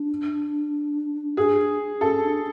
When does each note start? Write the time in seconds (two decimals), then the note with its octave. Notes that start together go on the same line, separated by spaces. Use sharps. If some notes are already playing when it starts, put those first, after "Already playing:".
Already playing: D4
1.37 G#4
2.00 C#4 A4
2.23 D4